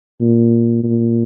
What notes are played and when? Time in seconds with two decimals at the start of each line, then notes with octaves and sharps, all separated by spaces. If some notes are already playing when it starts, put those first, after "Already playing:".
0.21 A#2
0.84 A#2